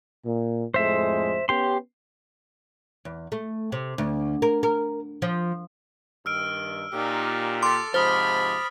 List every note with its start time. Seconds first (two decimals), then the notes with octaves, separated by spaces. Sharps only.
0.25 A#2
0.74 F2 A2 G#3 C5 E5
1.49 B3 C#4 G4 C6
3.05 E2
3.32 A3
3.72 C3
3.98 D2
4.42 A#4
4.63 A#4
5.22 F3
6.26 G2 D#3 E6 F6 D7
6.93 A#2 D#4 G4
7.63 A4 C6 D6 A6
7.94 G#2 C3 F3 C5 B5 D#6 F6 A6